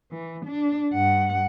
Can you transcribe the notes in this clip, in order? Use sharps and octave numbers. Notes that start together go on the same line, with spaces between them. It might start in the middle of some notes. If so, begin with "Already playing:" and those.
E3
D4
G2 F#5